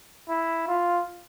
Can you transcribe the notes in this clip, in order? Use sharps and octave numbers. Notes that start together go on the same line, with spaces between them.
E4
F4